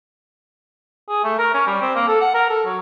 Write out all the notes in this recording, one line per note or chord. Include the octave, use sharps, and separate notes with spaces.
G#4
A3
A#4
C#4
G3
C4
A#3
A4
F#5
A#4
A4
F#3